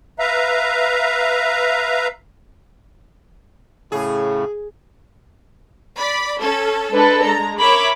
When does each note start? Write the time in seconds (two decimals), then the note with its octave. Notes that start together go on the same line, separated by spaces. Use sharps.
0.19 B4 E5 F5 A#5
3.92 A2 C#3 G#4
5.97 D5 B5
6.42 C#4 A4
6.92 G#3 D4 A4 B4
7.26 A#5
7.59 A#4 C#5 E5 B5 D6